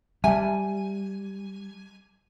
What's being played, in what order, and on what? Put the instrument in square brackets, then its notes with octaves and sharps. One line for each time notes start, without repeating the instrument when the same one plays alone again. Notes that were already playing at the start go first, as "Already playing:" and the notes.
[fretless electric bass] G3 [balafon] E5 A5 [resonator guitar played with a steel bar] G#5